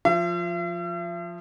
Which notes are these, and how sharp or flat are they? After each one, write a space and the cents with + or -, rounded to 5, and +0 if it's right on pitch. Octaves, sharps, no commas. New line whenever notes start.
F3 +5 E5 +45